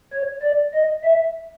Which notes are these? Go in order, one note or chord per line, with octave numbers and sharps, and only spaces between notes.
C#5
D5
D#5
E5